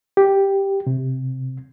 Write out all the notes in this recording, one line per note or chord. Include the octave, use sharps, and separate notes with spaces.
G4
C3